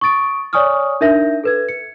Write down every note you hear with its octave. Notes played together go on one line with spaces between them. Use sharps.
C#6 D#6 A6 D7
C#5 D5 G#5 C#6 D#6 F6
D4 D#4 A#4 E5 G6 A#6
A4 B4 G#6
C#7